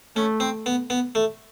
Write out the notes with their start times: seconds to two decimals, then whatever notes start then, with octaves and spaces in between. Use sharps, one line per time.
0.16 A3 C#4
0.40 C4
0.66 B3
0.90 B3
1.15 A3